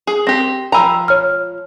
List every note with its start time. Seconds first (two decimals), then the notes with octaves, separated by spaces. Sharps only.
0.07 G#4
0.27 C4 G4 A#6
0.72 F3 G5 G#5 A#5 B5 E6
1.08 C#5 F6